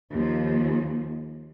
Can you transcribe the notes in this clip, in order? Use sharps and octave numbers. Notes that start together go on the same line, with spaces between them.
D#2 F3